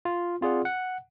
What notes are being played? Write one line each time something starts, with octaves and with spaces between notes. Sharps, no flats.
F4
C4 F4 G#4 D5 F#5
F#5